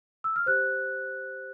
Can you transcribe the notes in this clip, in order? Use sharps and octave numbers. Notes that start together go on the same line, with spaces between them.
E6
F6
G4 C5 F#6